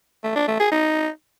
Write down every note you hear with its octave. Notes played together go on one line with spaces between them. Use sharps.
A3
D4
A3
G#4
D#4